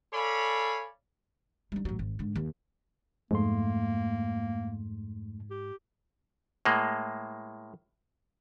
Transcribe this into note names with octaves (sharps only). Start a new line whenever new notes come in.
A4 C#5 D5 F5 G#5 B5
G3 D#4
A1 F#3
G#1
G#2 D3
D#2
F2 G#2 A3 A#3 C6
G4
A2 G#3 A#3